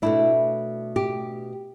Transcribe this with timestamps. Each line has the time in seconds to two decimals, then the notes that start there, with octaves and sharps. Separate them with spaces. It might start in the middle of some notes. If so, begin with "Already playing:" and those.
0.02 B2 A3 D4 E4
0.96 G4